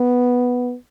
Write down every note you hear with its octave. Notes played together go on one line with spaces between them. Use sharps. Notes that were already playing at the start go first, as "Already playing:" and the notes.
Already playing: B3